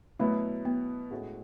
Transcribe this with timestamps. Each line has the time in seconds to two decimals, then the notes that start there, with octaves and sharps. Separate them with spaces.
0.19 B2 F#3 A3 B3 E4 B4
0.65 B3
1.11 A2 G#3 C#4 F#4